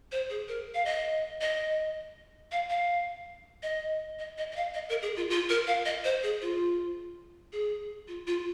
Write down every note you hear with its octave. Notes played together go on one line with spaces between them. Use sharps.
C5
G#4
A#4
F5
D#5
D#5
F5
F5
D#5
D#5
D#5
D#5
F5
D#5
A#4
G#4
F4
F4
A#4
F5
D#5
C5
G#4
F4
G#4
F4
F4